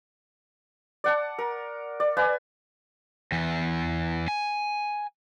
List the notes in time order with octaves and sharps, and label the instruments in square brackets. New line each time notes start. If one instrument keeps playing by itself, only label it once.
[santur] D5 F#5 A5
A#4
D5
B4 D5 F5 G#5
[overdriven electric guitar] E2 E3
G#5